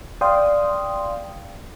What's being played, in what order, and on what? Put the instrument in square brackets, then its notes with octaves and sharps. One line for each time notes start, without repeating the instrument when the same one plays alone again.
[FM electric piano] D5 F5 G5 C6 D#6